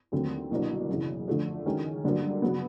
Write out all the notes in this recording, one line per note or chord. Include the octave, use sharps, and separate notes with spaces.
D#2 D3 F#3 A3 C4
C2 B2 F#3 A#3 D4
F#2 C#3 E3
D3 F3 A3 D4
D#3 G#3 C#4 F#4
G2 D3 F#3 A#3 D4
C#3 F#3 B3